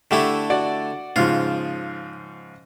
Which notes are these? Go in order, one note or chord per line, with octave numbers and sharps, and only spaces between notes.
D3 A3 E4 G4 C#6
F#4 D5 F#5
G#2 C#3 F3 F4